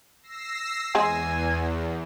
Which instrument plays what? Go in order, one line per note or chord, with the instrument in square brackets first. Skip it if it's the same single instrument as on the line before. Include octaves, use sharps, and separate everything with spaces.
[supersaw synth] E6 A#6 C7
[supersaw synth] E2 [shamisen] G#3 C4 G#4 [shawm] G#5